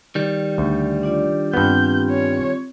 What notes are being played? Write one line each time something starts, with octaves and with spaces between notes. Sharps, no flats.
D#3 G3
D2
D4 F4 D5
G2 B3 C4 F4 G6
C#5